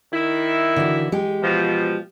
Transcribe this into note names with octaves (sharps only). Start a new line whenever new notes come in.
D#3 E4
D3 E3 F#4
G#3 G4
B2 F3